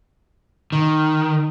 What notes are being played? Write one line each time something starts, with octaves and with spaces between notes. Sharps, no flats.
D#3